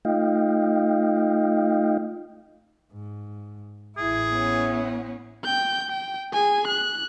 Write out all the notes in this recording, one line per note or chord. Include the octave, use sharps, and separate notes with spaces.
A3 D#4 F4 D#5 F5 G5
G#2
A1 E4 G#4
B3 C#4
G5 G6
G5
G#4 G#5
F#6